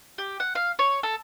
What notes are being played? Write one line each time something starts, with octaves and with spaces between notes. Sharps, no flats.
G4
F#5
F5
C#5
A4